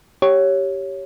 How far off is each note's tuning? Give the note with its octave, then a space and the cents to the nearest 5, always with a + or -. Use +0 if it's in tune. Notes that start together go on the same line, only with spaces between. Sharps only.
G4 -10 C#5 +0